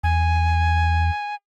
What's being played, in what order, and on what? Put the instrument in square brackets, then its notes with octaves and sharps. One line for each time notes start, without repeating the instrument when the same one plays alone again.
[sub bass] E2 [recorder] G#5